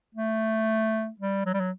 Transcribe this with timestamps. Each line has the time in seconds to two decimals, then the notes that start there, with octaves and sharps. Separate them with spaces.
0.15 A3
1.20 G3
1.46 F#3
1.54 G3
1.61 F#3